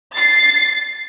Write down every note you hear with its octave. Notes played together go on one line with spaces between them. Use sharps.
A6 C7